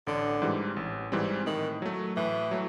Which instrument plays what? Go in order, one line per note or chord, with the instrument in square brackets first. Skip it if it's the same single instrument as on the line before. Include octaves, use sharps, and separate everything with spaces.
[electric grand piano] A1 [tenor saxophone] D3
[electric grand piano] G#2 E3 G3 C4
A1
G#2 E3 G3 C4
[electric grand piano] A2 [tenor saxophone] D#3
[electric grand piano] F#3 A3
[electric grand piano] A2 [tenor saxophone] E3
[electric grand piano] F#3 A3